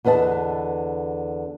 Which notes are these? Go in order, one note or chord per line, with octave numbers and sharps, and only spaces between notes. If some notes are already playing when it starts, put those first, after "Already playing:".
E2 D3 B4 D#5 A5